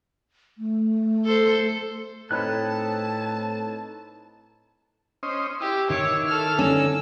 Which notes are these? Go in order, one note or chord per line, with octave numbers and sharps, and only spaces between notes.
A3
A4 C5
A2 C4 D#4 A4 B4 C#5 A5 F#6
C#4 C5 D#5
E4 G4
D#3 C#5 D6 E6
A4 F6
D3 C#4 D#4 E6